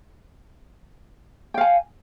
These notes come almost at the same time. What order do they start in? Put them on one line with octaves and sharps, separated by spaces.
G5 F5 G#5